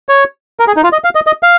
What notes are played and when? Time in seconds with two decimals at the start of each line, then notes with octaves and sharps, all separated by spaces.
0.09 C#5
0.60 A#4
0.67 G#4
0.76 D#4
0.84 F4
0.93 D#5
1.04 F5
1.15 D#5
1.27 D#5
1.43 F5